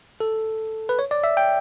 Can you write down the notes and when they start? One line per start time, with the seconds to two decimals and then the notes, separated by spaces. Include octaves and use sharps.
0.20 A4
0.89 B4
0.99 C#5
1.11 D5
1.24 E5
1.37 G5